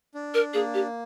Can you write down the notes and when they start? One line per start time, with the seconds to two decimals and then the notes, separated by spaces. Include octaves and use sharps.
0.14 D4
0.34 A#4
0.54 A#3 G#4
0.74 G4